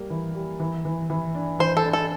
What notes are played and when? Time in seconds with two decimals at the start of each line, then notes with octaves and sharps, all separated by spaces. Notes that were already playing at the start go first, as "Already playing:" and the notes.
Already playing: G3 A#3
0.10 E3
0.35 G3
0.60 E3
0.85 E3
1.10 E3
1.35 D4
1.59 E3 C5
1.77 A4
1.84 D4
1.93 A4